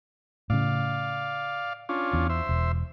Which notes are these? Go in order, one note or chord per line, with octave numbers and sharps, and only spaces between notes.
A2 C#3 D5 F5
C#4 D4 F4
E2
C5 E5
E1